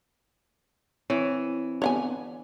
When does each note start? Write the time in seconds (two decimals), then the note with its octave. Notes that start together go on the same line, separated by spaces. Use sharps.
1.10 E3 C4 C#5
1.82 B3 D4 C#5 F#5 G#5